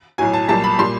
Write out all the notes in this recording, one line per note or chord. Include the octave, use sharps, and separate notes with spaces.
B1 A2 F#3 G#5
A5
B1 A#2 G3 A5
B5
A#2 G3 C6